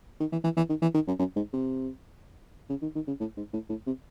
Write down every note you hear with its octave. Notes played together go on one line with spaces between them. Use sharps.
D#3
E3
E3
E3
D#3
E3
D#3
F#2
F#2
G#2
C3
C#3
D#3
D#3
C#3
A2
G#2
A2
A2
C3